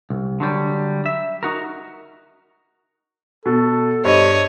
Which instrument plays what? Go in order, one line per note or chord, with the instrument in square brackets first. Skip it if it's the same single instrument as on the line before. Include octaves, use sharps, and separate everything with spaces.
[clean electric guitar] C2
D3 F#3 G3
E5
D#4 F#4 A#4
[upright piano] B2 [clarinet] A4
[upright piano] G2 [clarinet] C5 [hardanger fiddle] C#5 D#5